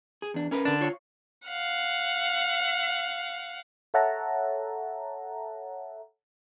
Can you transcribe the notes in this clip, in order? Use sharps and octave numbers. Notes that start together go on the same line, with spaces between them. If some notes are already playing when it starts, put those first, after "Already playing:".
G#4
E2 D4
C#4 A#4 B4
D3 D4
F4 C#5
F5 F#5
A4 C#5 E5 F#5 A5 A#5